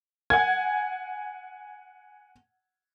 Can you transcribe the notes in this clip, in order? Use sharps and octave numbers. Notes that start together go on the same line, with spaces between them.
F#5 G#5 G#6